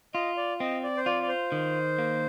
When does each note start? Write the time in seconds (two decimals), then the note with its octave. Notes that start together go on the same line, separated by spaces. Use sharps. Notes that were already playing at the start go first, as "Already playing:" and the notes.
0.14 F4 D#5
0.37 D5
0.60 C4 D#5
0.83 D5
0.97 C5
1.06 F4 D5
1.23 D5
1.29 C5
1.52 D#3
1.98 A#3